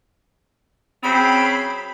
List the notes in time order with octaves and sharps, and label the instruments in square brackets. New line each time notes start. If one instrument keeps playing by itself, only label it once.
[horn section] C#3 F#3 C4 [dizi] B5